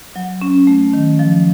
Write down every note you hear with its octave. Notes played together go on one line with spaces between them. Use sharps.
F#3
C#4
A3
D#3
F3